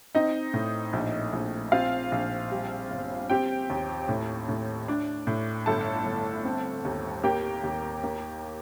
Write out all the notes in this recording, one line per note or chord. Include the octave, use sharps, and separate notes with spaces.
C4 D#4 D#5
A2
A#1
A#1
C4 F4 F5
A#1
G3
G1
C4 G4 G5
D#2
A2
A2
D4
A2
G1 A4 A5
G1
C4
D#2
A#3 G4 G5
D#2
A#3